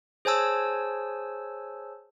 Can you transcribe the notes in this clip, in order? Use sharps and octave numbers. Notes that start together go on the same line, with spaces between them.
G#4 C5 C#5 G#5 A5 E6